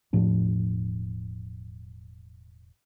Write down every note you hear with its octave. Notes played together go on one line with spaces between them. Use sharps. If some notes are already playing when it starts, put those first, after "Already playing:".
E1 A2 F3 D4